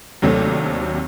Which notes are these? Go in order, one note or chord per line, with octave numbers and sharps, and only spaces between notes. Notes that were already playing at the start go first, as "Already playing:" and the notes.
D#2 C3 F#3 A3 C4 D4